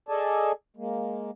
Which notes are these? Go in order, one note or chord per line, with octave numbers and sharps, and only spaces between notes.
G#4 A4 D5 D#5 G#5 A5
G#3 A#3